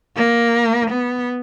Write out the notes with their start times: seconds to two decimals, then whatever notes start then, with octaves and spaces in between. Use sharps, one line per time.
0.17 A#3
0.91 B3